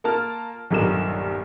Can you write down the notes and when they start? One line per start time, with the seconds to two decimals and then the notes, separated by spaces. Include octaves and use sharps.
0.04 A#3 F4 A#4 A5 F6
0.70 D#1 B1 G2 A#4 E7